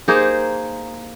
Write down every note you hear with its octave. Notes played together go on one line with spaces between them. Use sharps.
A#3 D#4 G#4 C5